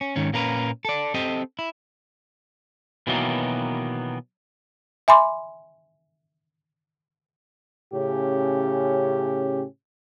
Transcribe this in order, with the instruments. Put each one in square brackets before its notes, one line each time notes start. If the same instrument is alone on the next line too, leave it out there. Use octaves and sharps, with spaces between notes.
[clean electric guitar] C#4
G#2 D#3 C#4
A#2 A#3 C#4 A#4 B4
A4 D5
C4 G4 A4 D#5
E4
B2 D#3 E3 F#3 A#3 B3
[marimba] E5 G#5 B5 C6 D6
[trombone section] A2 C#3 C#4 G4